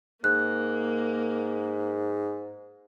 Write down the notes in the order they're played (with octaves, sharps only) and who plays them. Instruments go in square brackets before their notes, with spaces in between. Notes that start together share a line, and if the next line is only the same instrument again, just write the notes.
[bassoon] G#2 [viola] A#3 [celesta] F#6